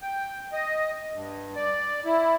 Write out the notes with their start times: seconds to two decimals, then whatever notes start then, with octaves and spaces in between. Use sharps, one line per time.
0.02 G5
0.53 D#5
1.14 G2
1.56 D5
2.05 E4